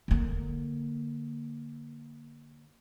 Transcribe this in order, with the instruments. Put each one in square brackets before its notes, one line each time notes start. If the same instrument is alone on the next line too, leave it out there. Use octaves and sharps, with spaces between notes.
[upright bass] D3 A#3